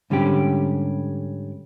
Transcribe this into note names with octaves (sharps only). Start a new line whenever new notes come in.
G#2 D3 G3 C#4 G4